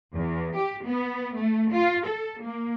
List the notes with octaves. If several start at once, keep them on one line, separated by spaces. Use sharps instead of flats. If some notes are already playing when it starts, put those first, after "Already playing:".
E2
G4
B3
A3
F4
A4
A#3